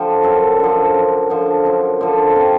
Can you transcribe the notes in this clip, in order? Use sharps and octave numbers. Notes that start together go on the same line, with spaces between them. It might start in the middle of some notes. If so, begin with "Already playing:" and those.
Already playing: D3 F3 G4
F#2 A4
D3 F3
F#2
D3 F3
F#2
D3 F3
C3